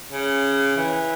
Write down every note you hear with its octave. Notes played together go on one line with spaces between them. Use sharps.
C#3
E3